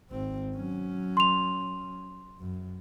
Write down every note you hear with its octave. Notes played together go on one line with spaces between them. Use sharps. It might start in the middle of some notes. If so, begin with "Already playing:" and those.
G#1 C4
F#3 C#4
C6 F7
F#2